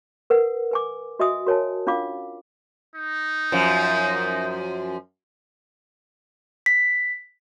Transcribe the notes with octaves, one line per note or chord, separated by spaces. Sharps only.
A#4 B4 F#5
B4 G#5 D6
F#4 D#5 E5 G#5 D#6
F#4 A#4 C#5 G#5 A5
C#4 D4 F4 F5 D6
D#4
F#2 F3
B6